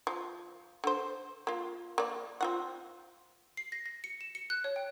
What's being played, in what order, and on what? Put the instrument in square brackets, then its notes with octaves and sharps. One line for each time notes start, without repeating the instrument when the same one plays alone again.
[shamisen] F3
D3 C5
A#3 F4
A#3 D5
C4 F4 F#5
[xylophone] C7
A#6
A#6
C#7
E7
C#7
F#6
C#5
G5